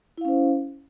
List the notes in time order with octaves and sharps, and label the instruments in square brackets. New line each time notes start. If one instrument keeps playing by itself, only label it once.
[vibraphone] E4
F5
C#4
C5